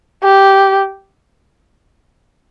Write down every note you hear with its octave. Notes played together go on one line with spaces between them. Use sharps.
G4